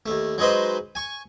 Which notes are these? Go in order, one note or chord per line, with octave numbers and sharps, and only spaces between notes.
D#2 A3
F#3 G#3 D#4 B4 C5
G#5 C#6